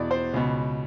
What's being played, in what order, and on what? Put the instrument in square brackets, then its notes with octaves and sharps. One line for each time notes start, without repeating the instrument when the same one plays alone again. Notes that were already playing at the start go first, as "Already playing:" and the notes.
Already playing: [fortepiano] E2 B2 D5
C5
C#2 B2